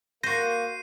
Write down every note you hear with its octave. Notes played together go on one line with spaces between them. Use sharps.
A#3 F#4 C5 A#6 C7 D#7